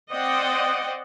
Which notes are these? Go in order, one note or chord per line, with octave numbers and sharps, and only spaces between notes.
C4 C5 D5 D#5 F#5 G5